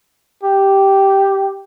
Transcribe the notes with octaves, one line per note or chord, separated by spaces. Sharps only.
G4